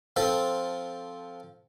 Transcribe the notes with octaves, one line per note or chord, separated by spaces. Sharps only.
F3 C4 A4